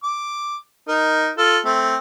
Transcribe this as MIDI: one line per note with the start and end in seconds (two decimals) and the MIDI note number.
0.04 0.57 86
0.88 1.30 63
0.88 1.30 70
1.38 1.59 65
1.38 1.59 69
1.65 1.96 57
1.65 1.96 60